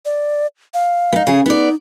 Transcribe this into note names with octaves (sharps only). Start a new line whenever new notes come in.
D5
F5
B3 D#4
C#3 G#4
B3 D#4 D5